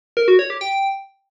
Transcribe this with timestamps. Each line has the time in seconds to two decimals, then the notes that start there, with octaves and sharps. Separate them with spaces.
0.17 A#4
0.28 F#4
0.39 C#5
0.50 G4
0.61 G5